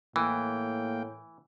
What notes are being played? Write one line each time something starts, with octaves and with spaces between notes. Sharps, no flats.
A2 E3 A#3 G5